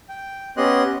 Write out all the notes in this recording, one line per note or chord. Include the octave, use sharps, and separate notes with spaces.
G5
B3 C#4 G4 D#5 C6 F#6